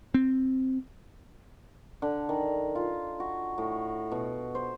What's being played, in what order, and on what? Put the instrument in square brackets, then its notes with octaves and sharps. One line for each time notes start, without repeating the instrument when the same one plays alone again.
[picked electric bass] C4
[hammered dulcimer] D3
D#3
F4
F#4
A2
B2
C5